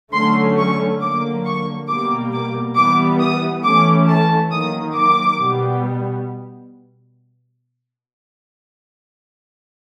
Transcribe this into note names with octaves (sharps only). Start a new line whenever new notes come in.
D3 F#3 A3 C#4 C6
C#6
D3 F#3 A#3 D6
C#6
B2 G3 A#3 D6
D6
E3 G3 B3 D6
D#6
E3 A3 C#4 D6
A5
D#3 F#3 A#3 D#6
D6
B2 G3 B3